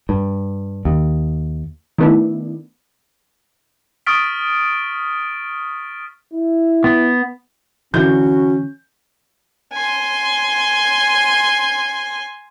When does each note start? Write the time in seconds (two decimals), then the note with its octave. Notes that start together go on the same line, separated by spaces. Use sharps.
0.09 G2
0.85 D#2
1.98 D#3 A3 B3 D4 E4
4.06 C#6 D#6 F6 A6 B6 D7
6.33 E4
6.84 B3
7.94 D3 E3 C#4 F#4 G6
9.74 G#5 C6